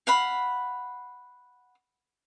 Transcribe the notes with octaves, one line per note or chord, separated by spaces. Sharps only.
F5 F#5 B5